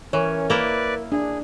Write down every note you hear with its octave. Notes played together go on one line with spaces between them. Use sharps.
E3 C#4 A#4 C#5
A#3 E4 B4 D5
D4 G#4